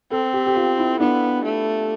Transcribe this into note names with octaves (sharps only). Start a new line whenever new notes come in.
C4 A4
G4
G4
F4
E4
B3 D4
A3